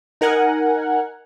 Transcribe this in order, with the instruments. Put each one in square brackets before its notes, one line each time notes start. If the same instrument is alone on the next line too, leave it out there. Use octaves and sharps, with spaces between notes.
[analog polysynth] D#4 A#4 F#5 G#5